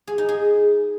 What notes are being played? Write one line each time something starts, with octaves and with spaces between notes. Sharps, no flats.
G#4
D#4
G#4